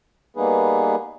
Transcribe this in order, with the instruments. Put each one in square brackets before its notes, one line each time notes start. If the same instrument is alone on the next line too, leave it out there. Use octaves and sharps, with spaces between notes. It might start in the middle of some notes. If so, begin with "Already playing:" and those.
[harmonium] G3 A#3 B3 D#4 G#4 B4